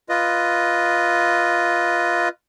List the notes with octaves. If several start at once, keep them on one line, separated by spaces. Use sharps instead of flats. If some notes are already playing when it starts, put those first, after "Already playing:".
F4 B4 D#5